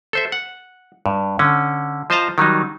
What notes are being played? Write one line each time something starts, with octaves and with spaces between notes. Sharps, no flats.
A4 C5 E5
F#5
G2
D3 C#4
F3 C5 D#5 A5 A#5
D#3 F#3 G3 D#4